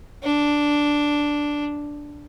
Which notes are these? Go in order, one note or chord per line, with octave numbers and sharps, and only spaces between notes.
D4